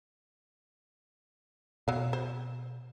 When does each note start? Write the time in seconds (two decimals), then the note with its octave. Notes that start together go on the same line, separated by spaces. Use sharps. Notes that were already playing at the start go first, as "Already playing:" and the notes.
1.88 B2 F#3 F5
2.13 C5